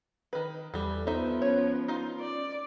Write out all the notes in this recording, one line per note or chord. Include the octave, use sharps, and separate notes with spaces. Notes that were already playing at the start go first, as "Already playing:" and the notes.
D#3 B4
E2 E3 G3 A4
D#2 F3 B3 D#4 A4 C5 E5
C#4 C#5
D#4 F4
D5